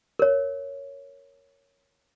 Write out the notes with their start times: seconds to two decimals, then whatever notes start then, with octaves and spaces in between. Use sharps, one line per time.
0.19 A#4 C#5